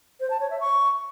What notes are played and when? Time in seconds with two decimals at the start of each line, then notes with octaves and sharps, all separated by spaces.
0.20 C5
0.30 A5
0.40 C#5
0.50 E5
0.60 C#6